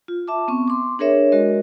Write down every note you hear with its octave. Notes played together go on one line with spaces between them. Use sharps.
F4
E5 A5 D6
B3 C4 C#6
C6 D6
D4 G#4 A#4 C#5 E5
G#3 F#4 A#4 D#5